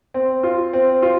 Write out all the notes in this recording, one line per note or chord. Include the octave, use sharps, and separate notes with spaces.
C4
F4
C4
F4